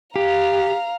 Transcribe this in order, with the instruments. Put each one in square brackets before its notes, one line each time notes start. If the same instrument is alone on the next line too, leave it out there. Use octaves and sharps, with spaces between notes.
[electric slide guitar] G4 [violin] F5 A#5